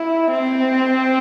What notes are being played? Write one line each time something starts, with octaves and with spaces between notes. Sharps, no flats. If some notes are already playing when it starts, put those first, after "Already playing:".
Already playing: E4
C4